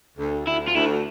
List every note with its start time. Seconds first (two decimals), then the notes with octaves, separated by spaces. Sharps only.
0.17 D2
0.47 D2 E4
0.68 F4
0.75 D2 E4